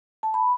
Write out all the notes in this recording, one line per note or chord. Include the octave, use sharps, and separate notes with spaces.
A5
B5